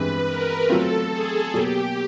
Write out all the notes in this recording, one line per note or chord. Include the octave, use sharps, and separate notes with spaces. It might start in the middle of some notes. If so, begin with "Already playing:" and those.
Already playing: G2 E3 G#3 C4 B4
A#4
F#3 A3 C4 F4 A4
G#4
B2 F#3 A#3 G4